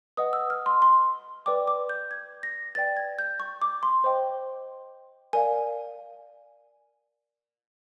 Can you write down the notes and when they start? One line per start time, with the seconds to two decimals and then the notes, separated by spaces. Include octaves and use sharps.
0.17 B4 D#5 F#5 D#6
0.33 E6
0.50 F6
0.66 C6
0.82 C6
1.46 B4 D5 G5 D6
1.68 D6
1.89 G6
2.11 G#6
2.43 A#6
2.75 B4 D5 G5 A6
2.97 G#6
3.19 G6
3.40 C#6
3.62 D6
3.83 C6
4.04 C5 D#5 G5
5.33 A#4 D5 F5 G#5